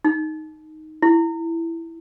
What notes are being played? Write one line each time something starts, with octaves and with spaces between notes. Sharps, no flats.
D#4
E4